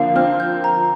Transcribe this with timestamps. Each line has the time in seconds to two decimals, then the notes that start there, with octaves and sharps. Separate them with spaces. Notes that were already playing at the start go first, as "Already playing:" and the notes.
Already playing: D3 F3 A#3 F5
0.16 C4 F6
0.40 G6
0.64 A#5